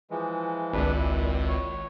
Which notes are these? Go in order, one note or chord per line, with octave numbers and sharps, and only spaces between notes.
E3 F3 G#3
G#1 C#2 D4 B4
A#2 E4
C#5